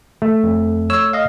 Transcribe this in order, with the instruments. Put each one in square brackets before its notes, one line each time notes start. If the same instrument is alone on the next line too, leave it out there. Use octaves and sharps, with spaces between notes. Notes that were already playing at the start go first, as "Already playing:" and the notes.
[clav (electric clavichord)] A3
[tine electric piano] F2
C#5 E6
D#5 F5